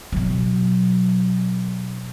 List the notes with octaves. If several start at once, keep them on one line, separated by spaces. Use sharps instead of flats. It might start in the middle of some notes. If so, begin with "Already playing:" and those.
B2 F#3